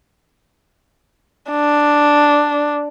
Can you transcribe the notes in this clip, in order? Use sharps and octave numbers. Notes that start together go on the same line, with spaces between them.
D4